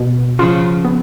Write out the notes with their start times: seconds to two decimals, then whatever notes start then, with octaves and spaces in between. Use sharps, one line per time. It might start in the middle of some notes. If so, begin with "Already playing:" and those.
Already playing: B2
0.39 C#3 F3 F4
0.85 B3